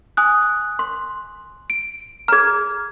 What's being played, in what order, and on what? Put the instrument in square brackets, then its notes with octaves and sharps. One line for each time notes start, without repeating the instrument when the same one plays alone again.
[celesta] G#5 D#6 F#6
[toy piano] C6
[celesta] D7
[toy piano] G#4 A#5 [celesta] F6 G#6